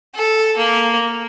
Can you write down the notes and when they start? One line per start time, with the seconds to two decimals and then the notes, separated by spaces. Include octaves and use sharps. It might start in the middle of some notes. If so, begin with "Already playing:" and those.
0.15 A4
0.57 A#3